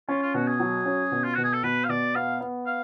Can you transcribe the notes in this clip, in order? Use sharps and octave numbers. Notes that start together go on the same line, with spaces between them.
C#4 F4
F4
B2 F#4
G#4
F#3
C#4
B2
F4
B2 F#4
G#4
A4
B2 B4
F5
B2 D5
B3 F5
B3
F5